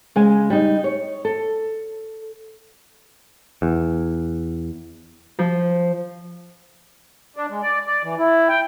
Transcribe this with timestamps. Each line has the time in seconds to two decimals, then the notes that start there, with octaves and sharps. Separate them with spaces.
0.16 C#3 G#3 G#5
0.50 G3 D#4
0.84 C#5
1.25 A4
3.62 E2
5.39 F3
7.37 D4
7.50 G#3
7.62 D5
7.87 D5
8.04 E3
8.19 E4
8.49 G5